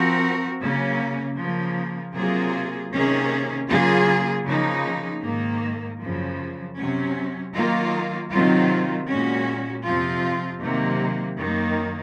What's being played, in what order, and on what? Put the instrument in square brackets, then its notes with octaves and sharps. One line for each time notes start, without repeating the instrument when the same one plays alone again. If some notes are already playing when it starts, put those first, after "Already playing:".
Already playing: [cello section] F3 C4 F#4 A#4
C#3 F#3 A#3 C#4
C#3 F3 A#3
C3 F#3 A#3 F4 G#4
C3 D#3 A#3 C#4 G#4
C#3 F#3 A#3 F4 G#4
C#3 F3 A#3 D#4
G#2 D#3 A#3
F#2 C#3 F3
C3 F#3 C#4
D#3 F#3 A#3 F4
C3 D#3 F#3 C4 F4
A#2 G#3 C#4 F#4
F2 C3 F3 C4 F4
C3 D#3 F#3 A#3
F#2 D#3 A#3